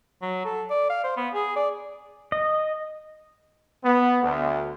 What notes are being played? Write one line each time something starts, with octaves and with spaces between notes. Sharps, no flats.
F#3
A4
D5
F5
C5
B3
G#4
D5
D#5
B3
D2